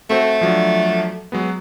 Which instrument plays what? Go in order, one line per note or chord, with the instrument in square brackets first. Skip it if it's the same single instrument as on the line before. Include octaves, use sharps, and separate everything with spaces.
[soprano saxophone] A3 [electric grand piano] C4 F#4 C5
[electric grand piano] F3 F#3 D4
F#3 G#3 B3